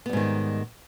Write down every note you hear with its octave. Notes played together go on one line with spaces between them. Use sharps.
G#2 D#3 G3 B3